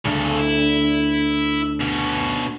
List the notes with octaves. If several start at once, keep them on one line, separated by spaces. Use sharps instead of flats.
D2 C#3 A4
E4
B2 C#4